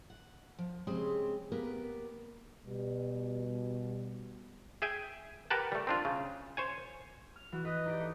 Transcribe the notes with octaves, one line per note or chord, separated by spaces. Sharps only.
F#5
F3
C#3 G#3 C4 G4 G#4
A#3 B3 G4 A#4 B4
B2 G3
G#4 E5 G5 G#5
G4 A#4 B4 F#5 G5 A5
G3 A3
C4 D4 F4
C#3
C5 C#5 G#5
F6
E3 F#4
B4 D#5
D#4 G4 D5
A3